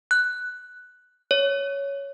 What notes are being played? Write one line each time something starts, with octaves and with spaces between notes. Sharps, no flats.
F#6
C#5